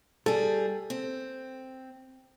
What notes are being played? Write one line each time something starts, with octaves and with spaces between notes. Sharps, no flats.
G3 G#4 A4
C4